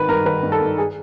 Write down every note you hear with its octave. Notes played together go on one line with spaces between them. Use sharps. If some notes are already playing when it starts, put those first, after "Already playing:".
Already playing: G#1 D#3 B4
G2 A#4
D#3 B4
G2
A4
G2
G#4